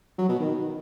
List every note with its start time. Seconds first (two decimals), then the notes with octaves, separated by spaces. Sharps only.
0.18 F#3
0.29 B2
0.40 D#3